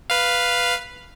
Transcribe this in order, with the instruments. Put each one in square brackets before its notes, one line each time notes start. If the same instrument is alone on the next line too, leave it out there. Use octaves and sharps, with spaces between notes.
[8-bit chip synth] B4 F5